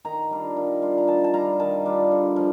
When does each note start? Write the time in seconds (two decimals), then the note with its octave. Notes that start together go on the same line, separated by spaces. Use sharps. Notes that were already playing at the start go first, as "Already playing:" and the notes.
0.05 D#3 A#5
0.30 G3 D4 F4
0.57 D#3
0.82 G3 D4 F4
0.98 A#5
1.07 D#3 A5
1.24 A5
1.34 G3 D4 F4 A#5
1.60 D#3 A5
1.85 G3 D4 F4
2.11 D3
2.36 F3